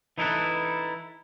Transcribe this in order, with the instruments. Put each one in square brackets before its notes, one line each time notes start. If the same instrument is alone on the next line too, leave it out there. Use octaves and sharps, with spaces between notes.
[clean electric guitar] E3 D#4 E4 A4 B4